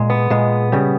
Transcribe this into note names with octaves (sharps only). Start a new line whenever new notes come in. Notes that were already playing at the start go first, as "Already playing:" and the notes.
Already playing: A#2 G#3
B3
A#2 G#3
C#3 G3